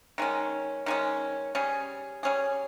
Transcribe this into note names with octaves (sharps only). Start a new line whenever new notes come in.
D#3 G#3 C#4
D#3 G#3 C#4
G3 C#4 G#4
G3 C#4 G#4